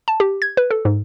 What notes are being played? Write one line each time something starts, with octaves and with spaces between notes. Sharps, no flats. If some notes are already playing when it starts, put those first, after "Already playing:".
A5
G4
G#6
B4
A4
G#2